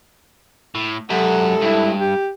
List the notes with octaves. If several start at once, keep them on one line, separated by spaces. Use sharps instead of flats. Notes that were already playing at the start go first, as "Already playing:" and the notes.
A2
F#2 G#3 G4 A4 E5 F#5
G2 E4
G4